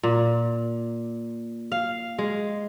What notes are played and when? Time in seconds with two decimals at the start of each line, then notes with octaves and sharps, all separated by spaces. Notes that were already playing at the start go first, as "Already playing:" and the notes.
0.03 A#2
1.72 F5
2.18 G#3